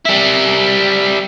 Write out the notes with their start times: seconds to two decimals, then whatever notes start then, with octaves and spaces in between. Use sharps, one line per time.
0.06 G3 E4